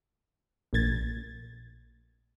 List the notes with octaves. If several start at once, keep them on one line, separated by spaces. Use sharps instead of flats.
A#1 A#2 G#6 A6